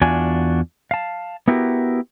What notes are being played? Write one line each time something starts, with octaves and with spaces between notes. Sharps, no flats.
E2 D4 F4 F#4 G#5
F5 A5
B3 E4 F#4 G4 A#4